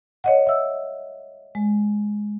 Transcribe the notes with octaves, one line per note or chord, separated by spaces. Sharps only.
C#5 D#5 F#5
E5 E6
G#3